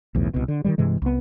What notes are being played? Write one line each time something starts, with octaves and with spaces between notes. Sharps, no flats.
B1 E2 A2
C2 B2
D3
D#3 E3 G3
G2 C3 E3 G#3
C2 B3